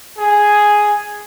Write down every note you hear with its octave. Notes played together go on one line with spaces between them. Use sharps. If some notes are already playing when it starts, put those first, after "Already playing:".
G#4